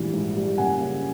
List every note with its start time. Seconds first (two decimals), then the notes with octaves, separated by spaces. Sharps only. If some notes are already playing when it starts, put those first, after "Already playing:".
Already playing: A#1 G#2 E3 G3
0.13 G#2
0.37 G3
0.58 F#1 F#5 G#5
0.80 C#3